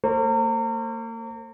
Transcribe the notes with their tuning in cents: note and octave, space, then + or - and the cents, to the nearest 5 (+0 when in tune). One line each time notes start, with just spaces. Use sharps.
A#3 -40 C5 +35